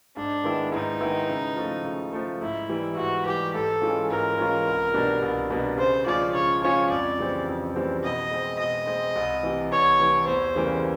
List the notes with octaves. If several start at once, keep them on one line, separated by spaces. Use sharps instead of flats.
G#2 D4
D#3 G#3 B3 E4
G#2 D#4
D#3 G#3 B3 E4
C#3
F3 A3
C#3
F3 A3
G#2 E4
E3 G3
G#2 F#4
E3 G3 G4
G#2 A4
E3 G#3 C#4 F4
G#2 A#4
E3 G#3 C#4 F4
C2
B2 G3 B3 D4
C2
B2 G3 B3 D4
C#3 C5
F3 G#3 C#4 F4 D5
C#3 C#5
F3 G#3 C#4 F4 C#5
F2 D5
C#3 E3 G3 C4
F2
C#3 E3 G3 C4
B2 D#5
G#3 C4
B2 D#5
G#3 C4
C2
C3 E3
C2 C#5
C3 E3
E2 C5
C#3 E3 G3 A#3